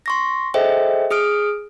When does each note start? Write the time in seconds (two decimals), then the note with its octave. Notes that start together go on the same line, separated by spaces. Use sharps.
0.06 C6 C#6 A#6
0.54 G#4 A4 C5 D#5 E5 G5
1.11 G#4 D#6 F6 D7